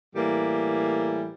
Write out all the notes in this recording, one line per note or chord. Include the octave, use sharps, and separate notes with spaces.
A2 E3 G3 A#3